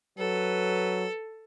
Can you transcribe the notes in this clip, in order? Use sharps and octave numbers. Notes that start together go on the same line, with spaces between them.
F#3 A4 B4